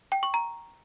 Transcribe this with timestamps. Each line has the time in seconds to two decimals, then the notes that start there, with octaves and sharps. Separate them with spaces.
0.12 G5
0.23 C#6
0.34 A#5